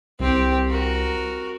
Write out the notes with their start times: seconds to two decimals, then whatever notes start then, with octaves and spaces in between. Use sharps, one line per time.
0.20 C2 C4 G4
0.70 F#4 A#4